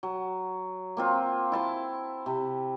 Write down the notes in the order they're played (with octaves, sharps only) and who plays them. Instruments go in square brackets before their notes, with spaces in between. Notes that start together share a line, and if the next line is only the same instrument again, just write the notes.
[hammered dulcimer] F#3
A#3 C4 F4
E4 A5 C6
C3